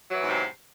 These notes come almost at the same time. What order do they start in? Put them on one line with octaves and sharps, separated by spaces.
F#3 E3 E2 G#2 C3